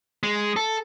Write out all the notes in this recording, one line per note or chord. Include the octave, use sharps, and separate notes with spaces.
G#3
A4